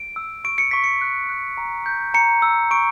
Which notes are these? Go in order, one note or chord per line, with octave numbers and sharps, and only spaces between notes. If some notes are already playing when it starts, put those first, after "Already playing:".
Already playing: D7
E6
C#6 D7
C#7
C#6 B6
C#7
F#6
F#6
A#5
G6
A#5 C#7
E6
C#6 D7